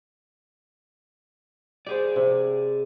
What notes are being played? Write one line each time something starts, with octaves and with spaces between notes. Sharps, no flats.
G4 G#4 C5 D5
C3